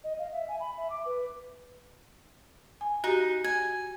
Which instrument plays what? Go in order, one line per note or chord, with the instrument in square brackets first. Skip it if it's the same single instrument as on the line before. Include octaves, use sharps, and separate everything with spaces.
[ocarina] D#5
F5
E5
G#5
B5
E5
D6
B4
[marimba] G#5
[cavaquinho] D#4 [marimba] F#4 G4
[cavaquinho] G#5